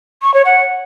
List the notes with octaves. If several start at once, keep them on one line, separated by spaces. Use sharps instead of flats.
C#6
C#5
F#5